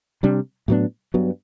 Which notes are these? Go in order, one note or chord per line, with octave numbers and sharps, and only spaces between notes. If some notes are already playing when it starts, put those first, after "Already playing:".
C3 G3 D4
A2 F#3 B3 D4
G2 F#3 B3